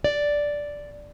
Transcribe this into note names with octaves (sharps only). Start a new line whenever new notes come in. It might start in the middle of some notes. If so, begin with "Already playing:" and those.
D5